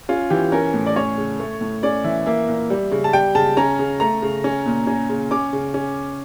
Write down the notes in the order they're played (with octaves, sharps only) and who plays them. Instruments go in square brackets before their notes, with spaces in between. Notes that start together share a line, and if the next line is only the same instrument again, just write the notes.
[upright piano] C#4 F4
E3 G4
C#4 A#4
A2
D5
C#4 C#5
C#3
A3
A2
C#4 D5
E3 E5
A#3 E5
A#2
G3
C#3
A5
G3 G5
C#3 A5
C#4 A#5
C#3
A3 A#5
C#3
C#4
A#2
C#4
C#3
C#4 D6
C#3
C#4